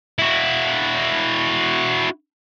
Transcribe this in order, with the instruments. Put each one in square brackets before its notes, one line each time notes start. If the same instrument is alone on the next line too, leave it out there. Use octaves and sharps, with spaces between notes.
[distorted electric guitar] E4 F#4